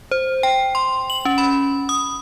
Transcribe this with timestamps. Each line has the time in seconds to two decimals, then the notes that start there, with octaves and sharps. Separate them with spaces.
0.11 C5
0.43 G5
0.75 C6
1.10 F#7
1.25 C#4
1.38 B5
1.89 D#6